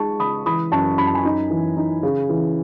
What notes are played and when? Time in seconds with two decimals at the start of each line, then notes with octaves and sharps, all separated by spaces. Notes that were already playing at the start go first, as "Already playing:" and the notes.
Already playing: G#3 D#4 A5 C#6
0.19 C#3 B5 D#6
0.46 E3 B5 D#6
0.72 F#2 A5 C#6
0.98 F#2 B5
1.07 A5
1.15 G#5 B5
1.25 D#4
1.50 E3
1.77 D#4
2.03 C#3
2.29 E3